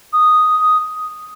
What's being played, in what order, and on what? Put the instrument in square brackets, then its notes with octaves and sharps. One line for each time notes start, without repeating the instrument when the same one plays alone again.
[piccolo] D#6